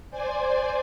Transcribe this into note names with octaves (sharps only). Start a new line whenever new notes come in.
C5 D5 G#5